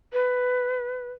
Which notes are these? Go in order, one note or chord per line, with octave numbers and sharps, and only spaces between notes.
B4